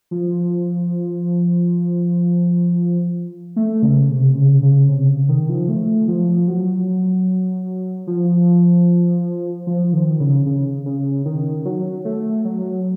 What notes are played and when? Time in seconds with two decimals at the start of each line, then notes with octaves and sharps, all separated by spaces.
0.11 F3
3.56 A3
3.83 C#3
4.10 C3
4.36 C#3
4.63 C#3
4.89 C3
5.08 C#3
5.29 D#3
5.49 F3
5.69 A3
6.08 F3
6.48 F#3
8.07 F3
9.67 F3
9.93 D#3
10.20 C#3
10.46 C#3
10.86 C#3
11.25 D#3
11.65 F#3
12.05 A3
12.45 F#3